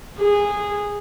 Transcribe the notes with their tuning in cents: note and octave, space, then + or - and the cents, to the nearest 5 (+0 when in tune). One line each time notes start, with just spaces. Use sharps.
G#4 -15